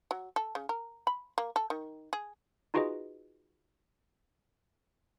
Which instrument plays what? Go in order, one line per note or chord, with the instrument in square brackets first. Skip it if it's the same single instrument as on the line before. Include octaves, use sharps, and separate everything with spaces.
[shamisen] F#3
A4
C#3
A#4
B5
A#3
A4
D#3
G#4
[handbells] D#4 F4 F#4 G#4 B4 D#5